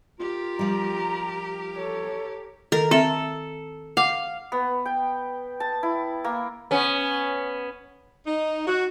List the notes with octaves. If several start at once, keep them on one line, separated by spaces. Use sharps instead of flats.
F4 G4 A#4
F3 G3 A#5
A4 C#5
D#3 A4 A#4
C4 A4 E5
F5 F#5 D6
B3
G5
A5
E4
A#3
B3 C#4
D#4
F#4